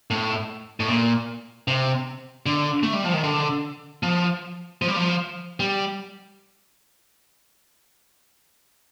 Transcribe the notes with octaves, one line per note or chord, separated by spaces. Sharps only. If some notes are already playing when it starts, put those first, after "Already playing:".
A2
A2
A#2
C3
D3
A3
G3
F3
D#3
D3
F3
F3
G3
F3
G3